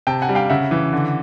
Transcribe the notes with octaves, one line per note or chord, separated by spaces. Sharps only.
C3 G5 A5
F#5 G#5
G3
F5 G5
C#3 E5 F#5
E3
D3